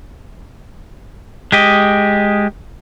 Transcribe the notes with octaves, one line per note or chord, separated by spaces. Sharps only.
G#3 G4 D#5